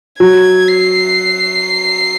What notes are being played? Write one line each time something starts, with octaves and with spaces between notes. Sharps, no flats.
F#3 G#6
C7